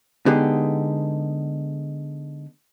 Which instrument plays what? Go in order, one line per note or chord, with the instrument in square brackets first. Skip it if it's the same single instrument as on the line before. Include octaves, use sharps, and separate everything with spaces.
[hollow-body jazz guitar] D3 G#3 B3 D#4 G4 G#4